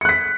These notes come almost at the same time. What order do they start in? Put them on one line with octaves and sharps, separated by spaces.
C#7 F#6 B6